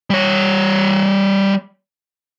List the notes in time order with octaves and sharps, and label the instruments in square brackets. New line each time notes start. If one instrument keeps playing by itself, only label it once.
[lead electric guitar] G3 C#5